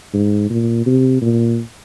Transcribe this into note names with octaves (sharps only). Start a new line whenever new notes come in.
G#2
A#2
C3
A#2